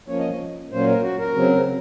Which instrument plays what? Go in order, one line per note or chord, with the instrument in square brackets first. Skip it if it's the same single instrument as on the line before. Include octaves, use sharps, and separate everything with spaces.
[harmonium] F3 A#3 C#4 C#5
D#5
A#2 F#3 A#3 C#4 C5
A#4
F#4
A#4
C#3 F#3 C4